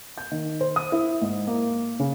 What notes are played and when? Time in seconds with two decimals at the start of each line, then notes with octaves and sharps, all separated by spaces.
0.18 G6
0.32 D#3
0.61 C5
0.76 D#6
0.92 E4
1.22 G#2
1.47 A#3
1.99 C#3